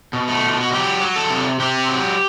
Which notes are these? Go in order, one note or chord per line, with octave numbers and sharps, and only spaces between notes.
B2
A3
B2
F#4
F#3 G4
F#3
A4
C3
C3 G4
F#3